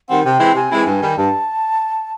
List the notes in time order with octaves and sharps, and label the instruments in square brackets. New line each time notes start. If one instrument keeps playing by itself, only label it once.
[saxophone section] D#3 G3 C4 [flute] F#5
[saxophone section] C3 [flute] G5
[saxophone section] E3 G#3 C4 E4
[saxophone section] C3 [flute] G#5
[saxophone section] E3 G#3 C4 E4
G2
D#3 G3
[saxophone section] G2 [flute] A5